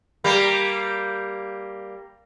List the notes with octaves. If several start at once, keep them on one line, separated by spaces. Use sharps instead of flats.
G3 A#3